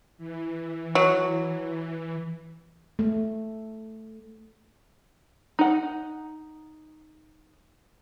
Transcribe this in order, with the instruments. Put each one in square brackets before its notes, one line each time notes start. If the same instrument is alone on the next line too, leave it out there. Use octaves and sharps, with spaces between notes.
[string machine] E3
[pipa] F#3
[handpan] A3
[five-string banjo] D#4 F#5